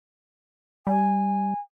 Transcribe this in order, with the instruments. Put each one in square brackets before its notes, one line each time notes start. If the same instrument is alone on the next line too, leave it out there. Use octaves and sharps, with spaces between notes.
[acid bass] G3 [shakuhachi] G#5